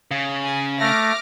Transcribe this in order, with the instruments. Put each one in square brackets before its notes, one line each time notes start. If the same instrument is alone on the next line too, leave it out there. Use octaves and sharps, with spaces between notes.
[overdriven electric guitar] C#3
[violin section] G#5
[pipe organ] A3 [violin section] D6 F6 A#6